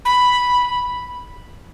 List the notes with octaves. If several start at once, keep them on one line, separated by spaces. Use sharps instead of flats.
B5